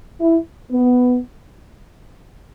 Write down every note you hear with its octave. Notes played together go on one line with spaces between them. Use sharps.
E4
B3